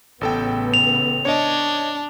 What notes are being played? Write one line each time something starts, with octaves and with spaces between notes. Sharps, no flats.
A1 A2 C#3 B3 A4 G5
F7
D4 C#5 D#5